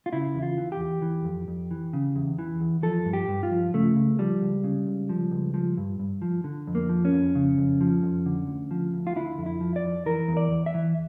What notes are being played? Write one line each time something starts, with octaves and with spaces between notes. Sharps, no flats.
F4
C#3 E4
E2
F4
E3
G4
E2
E3
F2
F2
E3
C#3
E2
E3
E2
F3 A4
G2
G4
G2
F4
F3
C#3 A3
C#2
F3 G3
C#2
C#3
C#2
F3
C#2
F3
G2
G2
F3
D3
F2
A#3
F3
C#4
F2
C#3
F2
F3
F2
D3
D2
F3
D2
F4
D3 E4
F2
E4
F3
D5
F2
E3 A#4
E2
D5
E2
E5
E3